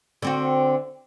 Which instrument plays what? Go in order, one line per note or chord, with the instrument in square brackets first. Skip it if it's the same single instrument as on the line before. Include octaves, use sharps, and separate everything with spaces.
[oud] D3 C4 F#4